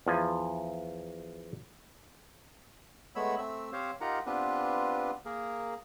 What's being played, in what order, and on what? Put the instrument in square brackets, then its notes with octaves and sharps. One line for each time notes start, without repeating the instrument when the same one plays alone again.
[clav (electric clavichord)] E2 F3 G#5
[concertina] G#3 A3 B3 C#5 B5 E6
A3 C4 E5 E6
C4 G4 C5 C#5 F5
D#4 F4 G4 A#4 F#5 A#5
B3 C4 D4 F4 G4 B4
A#3 G#4 A#4